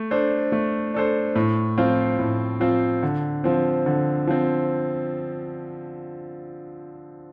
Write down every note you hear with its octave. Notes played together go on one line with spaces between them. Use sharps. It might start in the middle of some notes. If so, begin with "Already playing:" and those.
Already playing: A3
D4 A4 C5
A3
D4 A4 C5
A2
F3 C4 F4 C5
A2
F3 C4 F4 C5
D3
F3 C4
D3
F3 C4